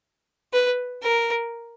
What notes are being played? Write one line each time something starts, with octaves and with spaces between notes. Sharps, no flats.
B4
A#4